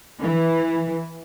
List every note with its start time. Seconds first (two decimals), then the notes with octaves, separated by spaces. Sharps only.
0.22 E3